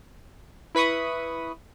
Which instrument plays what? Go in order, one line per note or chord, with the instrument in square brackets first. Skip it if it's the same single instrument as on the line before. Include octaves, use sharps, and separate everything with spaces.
[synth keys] E4 B4 B5 C#6 D#6